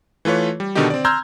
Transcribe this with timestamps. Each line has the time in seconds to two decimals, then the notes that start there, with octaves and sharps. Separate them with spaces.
0.25 E3 A3 F4 B4 C#5
0.60 G3
0.75 B2 D3 D#3 D4 D#4 G4
0.90 C4 D5
1.05 A#5 C6 E6 F6 G6 G#6